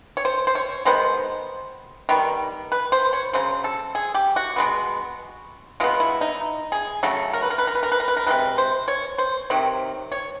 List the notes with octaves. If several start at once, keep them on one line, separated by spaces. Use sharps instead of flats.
C#5
C5
C5
C#5
D#3 G#3 B3 C5
D#3 G3 B3
B4
C5
C#5
C#3 F#3 C5
A4
G#4
G4
F#4
B2 G#3 B3
B2 G#3 B3 F4
E4
D#4
G#4
C#3 F#3 A3 A4
A#4
B4
A#4
B4
A#4
B4
A#4
B4
A#4
B4
A#4
C3 F3 G#3 B4
C5
C#5
C5
C3 D#3 F#3
C#5